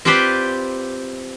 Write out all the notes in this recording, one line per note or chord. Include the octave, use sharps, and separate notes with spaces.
C4 F4 G4 B4 C5 D5